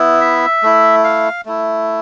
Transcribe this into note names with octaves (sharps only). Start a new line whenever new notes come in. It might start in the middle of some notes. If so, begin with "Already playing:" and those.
Already playing: B3 E4
E5
A3 E4
F5
A3 E4